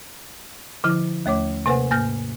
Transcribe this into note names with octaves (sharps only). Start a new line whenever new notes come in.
D3 F3 E4
D#2 A3 C#5 D6
C3 A#3 B4 C5 F#5 G#5
G#2 A#3 G#5 F6 G6 A#6